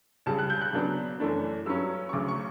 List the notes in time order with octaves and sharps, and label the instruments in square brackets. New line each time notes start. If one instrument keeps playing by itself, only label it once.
[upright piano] C#2 C#3 G3 A5
F#6
G6
F#6
C#3 F#3 B3 D4
F#2 E3 A3 D4
G2 F#3 C#4 E6
C#6
D2 C#3 F#3 D6
C#6